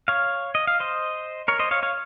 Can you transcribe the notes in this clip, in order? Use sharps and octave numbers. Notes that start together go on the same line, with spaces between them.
C#5 F5
D#5
F5
C5 D#5
A#4 C#5
C5 D#5
C#5 F5
C#5 F5